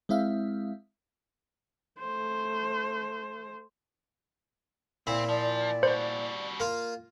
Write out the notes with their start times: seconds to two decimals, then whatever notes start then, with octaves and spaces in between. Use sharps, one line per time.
0.09 G#3 C4 E4 E5 F5
1.99 A3 C5
5.07 A#2 C4 E4
5.29 F3 D5
5.83 G3 F#4 C5
6.60 A#3 F4